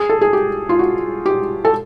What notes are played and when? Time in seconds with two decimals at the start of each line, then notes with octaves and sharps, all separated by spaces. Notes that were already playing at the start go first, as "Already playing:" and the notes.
Already playing: G#4
0.10 A4
0.21 G#4
0.33 G4
0.69 F4
0.79 F#4
1.26 G4
1.65 A4